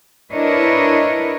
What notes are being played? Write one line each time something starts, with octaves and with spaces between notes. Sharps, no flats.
D4 E4 A#4 B4 C#5 D#5